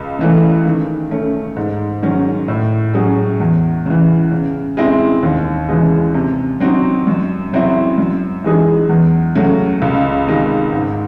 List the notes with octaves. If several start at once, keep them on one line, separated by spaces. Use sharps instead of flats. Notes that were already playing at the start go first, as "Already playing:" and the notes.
Already playing: C#2
C#3 E3 A3 C#4
D#3
A3 C#4
G#2
D#3 F#3 C#4
A2
F#3 C#4 G#4
E2
C#3 E3
C#3
G#3 C4 E4
D#2
C#3 E3 G#3
C3
F#3 C4 D#4 F#4
F#2
C#3 F#3 C4 E4
F#2
E3 G#3 D#4 G#4
E2
C#3 F#3 A3
C#2
C3 D#3 G#3
G#2